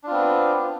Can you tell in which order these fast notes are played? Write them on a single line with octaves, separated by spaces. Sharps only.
D4 F4 C4 B3